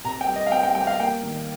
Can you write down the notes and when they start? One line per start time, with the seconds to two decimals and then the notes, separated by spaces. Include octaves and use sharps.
0.04 C3 A#5
0.21 G5
0.28 G3
0.36 D#5
0.47 F5
0.51 C4 G5
0.63 G5
0.75 G3 G5
0.87 F5
1.00 A#3 G5
1.23 D#3